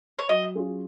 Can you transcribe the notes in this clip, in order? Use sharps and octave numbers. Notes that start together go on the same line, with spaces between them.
C#5
F#3 D#5
C#4 F4 G#4